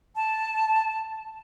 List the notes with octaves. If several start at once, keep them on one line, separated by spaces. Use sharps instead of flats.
A5